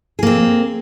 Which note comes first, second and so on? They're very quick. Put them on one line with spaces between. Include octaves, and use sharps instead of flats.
G#4 A#3 C4